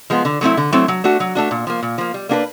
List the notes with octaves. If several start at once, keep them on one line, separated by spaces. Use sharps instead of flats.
F3 G#3 B3
D3
F#3 A3 C4 E4
D3
F#3 A3 C4 E4
F#3
A3 D4 F#4
F#3
A3 D4 F#4
A#2
F3 A#3
A#2
F3 A#3
G3
A#3 D4 F#4 B4